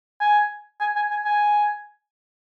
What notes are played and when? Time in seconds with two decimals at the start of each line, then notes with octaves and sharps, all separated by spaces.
0.20 G#5
0.80 G#5
0.96 G#5
1.10 G#5
1.25 G#5